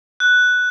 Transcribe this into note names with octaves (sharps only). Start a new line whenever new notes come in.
F#6